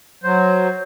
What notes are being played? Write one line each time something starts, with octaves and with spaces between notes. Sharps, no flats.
F#3 C5